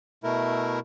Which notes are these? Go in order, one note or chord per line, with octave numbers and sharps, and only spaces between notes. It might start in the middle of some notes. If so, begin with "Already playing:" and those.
B2 A3 E4 A#4